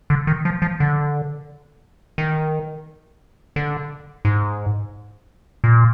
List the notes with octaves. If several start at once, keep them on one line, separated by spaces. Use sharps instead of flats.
D3
D#3
F3
F3
D3
D#3
D3
G#2
A#2